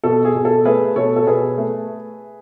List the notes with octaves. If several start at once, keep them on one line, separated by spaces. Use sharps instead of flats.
B2 A4
G#4
B2
A4
A3 G#4 B4
B2 A4 C#5
A4
B2 G#4 B4
A3